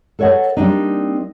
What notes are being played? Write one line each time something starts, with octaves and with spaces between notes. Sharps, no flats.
A4 B4 C#5 D#5 F#5
G3 A#3 C4 D4 D#4